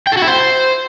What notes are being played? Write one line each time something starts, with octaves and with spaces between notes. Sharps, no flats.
G5
A4
F#4
E4
C5